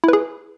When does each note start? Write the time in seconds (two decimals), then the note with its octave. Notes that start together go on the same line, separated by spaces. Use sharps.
0.04 E4
0.08 B4
0.13 G#4